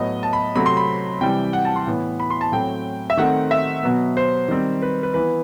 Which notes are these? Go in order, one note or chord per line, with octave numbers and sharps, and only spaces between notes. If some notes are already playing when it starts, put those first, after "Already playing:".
Already playing: A2 F#3 B3 D#5
A5
B5
C3 F#3 A3 C4 B5
C6
B5
C3 E3 G3 G5
F#5
A5
C6
A2 E3 B3
B5
C6
A5
A2 F#3 A3 C4 G5
E5
D#3 A3 C4 F#5
E5
B2 F#3 B3
C5
D#3 G3 C4
B4
B4
E3 B3 B4